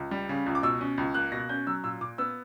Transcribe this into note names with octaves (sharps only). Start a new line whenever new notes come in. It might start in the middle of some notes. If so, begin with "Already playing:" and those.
Already playing: C#2
G3
C#3
C#2
D6
B2 E6
C#4
C#2
A#3 F#6
B2 A#6
C#4 G6
F#3 E6
A#2 E6
A#2 D6
B3 E6